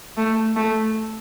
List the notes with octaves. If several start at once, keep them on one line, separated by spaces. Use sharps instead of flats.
A3
A3